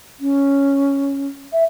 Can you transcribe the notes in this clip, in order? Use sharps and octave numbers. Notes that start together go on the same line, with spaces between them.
C#4
E5